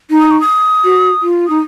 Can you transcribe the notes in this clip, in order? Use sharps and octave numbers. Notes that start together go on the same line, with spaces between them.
D#4
D#6
C#6
D#6
F#4
F4
D#4 D#6